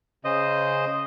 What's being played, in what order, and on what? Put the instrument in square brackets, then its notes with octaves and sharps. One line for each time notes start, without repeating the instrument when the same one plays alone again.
[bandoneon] C#3 C5 D#5